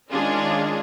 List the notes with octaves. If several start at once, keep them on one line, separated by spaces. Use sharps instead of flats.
D#3 G#3 C#4 D4 F4 G#4